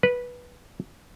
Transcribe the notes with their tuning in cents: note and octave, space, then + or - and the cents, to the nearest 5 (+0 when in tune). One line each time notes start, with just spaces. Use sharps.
B4 -10